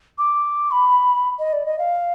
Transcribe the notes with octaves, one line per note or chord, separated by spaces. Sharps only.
D6
B5
D#5
D5
D#5
F5